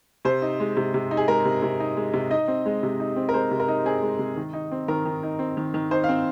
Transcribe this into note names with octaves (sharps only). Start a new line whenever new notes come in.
C3 C5
D#4
G#3
C3
C3
D#4
G#4
G#3 A#4
C3
C3
D#4
G#3
C3
D#4 D#5
C4
G#3
C3
D#4
C4
A#4
G#3 C5
C3
A#4
D#4
C4 G#4
G#3
C3
D#3
D#4
C4
D#3 A#4
D#3
D#4
C4
D#3
D#3
D#4 C5
F5
C4